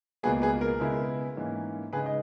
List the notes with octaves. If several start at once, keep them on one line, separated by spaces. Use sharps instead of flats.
C#2 B2 A#3 G#4 B4
G#4 B4
A#4
C#3 G#3 B3 E4
G#2 E3 A#3 C#4
C#3 G#3 D#4 G#4 B4
D#5